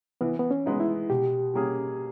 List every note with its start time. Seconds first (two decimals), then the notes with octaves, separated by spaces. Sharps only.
0.21 E3 B3
0.39 B3
0.51 C#4
0.66 G#3 B3 D#4
0.80 E4
1.10 B2 G4
1.54 G3 A#3 C#4 G#4